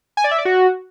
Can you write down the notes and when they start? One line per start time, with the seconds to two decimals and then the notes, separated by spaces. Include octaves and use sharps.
0.17 G#5
0.24 D5
0.31 E5
0.38 D5
0.45 F#4